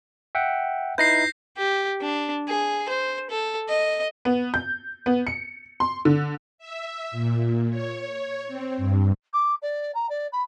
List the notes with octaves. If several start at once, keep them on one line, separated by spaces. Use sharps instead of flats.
E5 F#5 G5
D#4 E4 B4 G6 A#6 C7
G4
D4
G#4
C5
A4
D#5
B3
G6
B3
C#7
C6
D3
E5
A#2
C#5
C4
G2
D6
D5
A#5
D5
B5